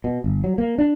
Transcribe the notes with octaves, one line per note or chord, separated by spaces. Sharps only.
B2
G1
F#3
A#3
D4